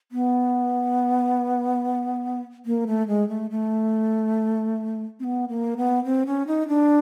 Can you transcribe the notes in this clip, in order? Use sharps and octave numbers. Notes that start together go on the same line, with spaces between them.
B3
A#3
A3
G#3
A3
A3
C4
B3
A#3
B3
C4
C#4
D#4
D4